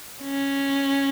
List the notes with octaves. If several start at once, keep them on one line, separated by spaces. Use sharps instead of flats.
C#4